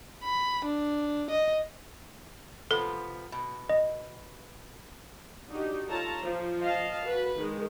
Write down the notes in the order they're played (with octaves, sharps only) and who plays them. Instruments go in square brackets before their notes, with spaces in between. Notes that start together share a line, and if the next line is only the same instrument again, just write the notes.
[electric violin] B5
D4
D#5
[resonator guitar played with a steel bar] C3 F3 B3 [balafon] A4
[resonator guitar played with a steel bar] B2
[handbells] D#5
[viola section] D4 D#4 F#4 G4
F4 A4 C#5 A5 A#5
F3
D#5 F5 A5
F#4 B4 B5
D#3 G#3